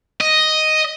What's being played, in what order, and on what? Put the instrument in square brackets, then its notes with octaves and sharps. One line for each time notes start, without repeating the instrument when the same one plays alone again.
[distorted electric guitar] D#5